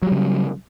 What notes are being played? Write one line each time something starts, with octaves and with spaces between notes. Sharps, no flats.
C#3 F#3 G3